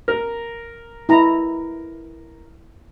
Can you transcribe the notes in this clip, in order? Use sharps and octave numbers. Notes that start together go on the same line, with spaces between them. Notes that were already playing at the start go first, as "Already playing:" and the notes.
A#4
E4 A#5